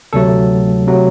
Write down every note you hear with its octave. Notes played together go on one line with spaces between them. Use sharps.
D2 C3 F#3 A3 A4
C3 F#3 A3